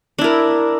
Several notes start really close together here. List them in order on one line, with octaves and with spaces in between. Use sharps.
D4 E4 A#4